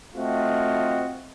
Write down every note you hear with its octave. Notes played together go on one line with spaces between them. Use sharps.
A3 C4 F4 F#4 D#5